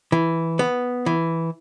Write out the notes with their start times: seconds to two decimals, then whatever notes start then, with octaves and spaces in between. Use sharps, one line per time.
0.12 E3
0.59 B3
1.06 E3